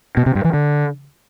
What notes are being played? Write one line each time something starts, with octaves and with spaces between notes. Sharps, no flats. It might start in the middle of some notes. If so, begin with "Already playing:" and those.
B2
C3
G2
E3
D3